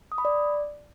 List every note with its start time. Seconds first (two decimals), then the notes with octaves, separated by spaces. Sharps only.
0.12 D#6
0.18 B5
0.25 D5